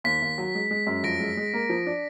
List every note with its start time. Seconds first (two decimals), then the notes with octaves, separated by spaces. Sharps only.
0.04 D#2 B6
0.22 D#2
0.38 F#3
0.55 G#3
0.71 G#3
0.87 F#2
1.03 F2 A#6 D7
1.20 G#3
1.37 G#3
1.53 A#3
1.69 F3
1.86 D4